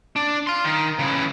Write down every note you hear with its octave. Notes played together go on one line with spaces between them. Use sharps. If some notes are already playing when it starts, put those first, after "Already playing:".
D4
F5 C6
D#3
C#3 E3